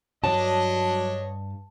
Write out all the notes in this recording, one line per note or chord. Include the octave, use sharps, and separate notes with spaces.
G2 F#3 D4 C#5 D#5 A5